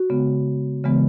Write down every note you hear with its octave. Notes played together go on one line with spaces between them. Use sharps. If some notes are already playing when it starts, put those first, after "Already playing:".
Already playing: F#4
C#3 G#3 B3
C#3 E3 G#3 B3